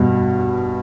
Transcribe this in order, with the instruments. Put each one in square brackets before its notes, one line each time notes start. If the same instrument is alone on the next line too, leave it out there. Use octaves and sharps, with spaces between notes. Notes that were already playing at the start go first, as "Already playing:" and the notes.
Already playing: [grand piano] G2 B2